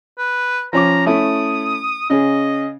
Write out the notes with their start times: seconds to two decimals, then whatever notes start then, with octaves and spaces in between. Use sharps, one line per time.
0.18 B4
0.73 F3 C#4 A#5 D6
1.06 A3 C#4 E4 D#6
2.10 C#3 C#4 G#4 D#5